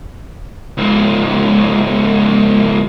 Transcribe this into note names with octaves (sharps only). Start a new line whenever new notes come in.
C#2 G#2